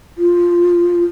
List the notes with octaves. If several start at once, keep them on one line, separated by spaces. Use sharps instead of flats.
F4